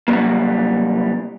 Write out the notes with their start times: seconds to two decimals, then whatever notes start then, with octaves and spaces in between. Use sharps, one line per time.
0.08 C3 F#3 G3 A#3